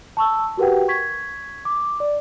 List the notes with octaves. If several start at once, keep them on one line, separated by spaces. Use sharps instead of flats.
A5 C#6 E6
F#4 G4 A#4 B4 F#5 G5
C#6 G#6 B6
D6
D5